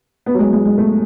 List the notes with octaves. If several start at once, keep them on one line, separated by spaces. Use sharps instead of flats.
B3
F#3
G#3
G#3
G#3
A3